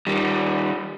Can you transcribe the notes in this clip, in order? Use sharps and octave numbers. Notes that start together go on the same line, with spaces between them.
D#3 G3